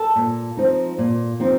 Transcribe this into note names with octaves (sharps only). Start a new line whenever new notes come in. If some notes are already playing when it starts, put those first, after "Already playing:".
Already playing: A4
A#2
F3 C4 D#4
A#2
F3 C4 D#4